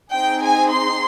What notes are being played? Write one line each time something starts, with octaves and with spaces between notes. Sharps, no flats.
C4 D#4 G#4 G5
G#5
C6